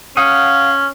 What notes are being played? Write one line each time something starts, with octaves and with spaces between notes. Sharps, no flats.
C#4 F5 F#5 D#6